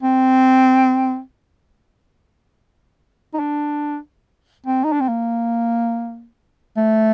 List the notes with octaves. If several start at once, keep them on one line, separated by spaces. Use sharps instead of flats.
C4
D#4
D4
C4
D#4
D4
C4
A#3
A3